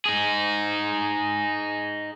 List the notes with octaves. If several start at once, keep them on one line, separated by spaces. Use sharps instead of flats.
D#4 G#4